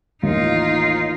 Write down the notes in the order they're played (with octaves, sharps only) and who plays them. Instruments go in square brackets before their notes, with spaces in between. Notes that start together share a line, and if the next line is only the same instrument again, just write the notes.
[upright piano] A1 D#2 [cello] D#4 F4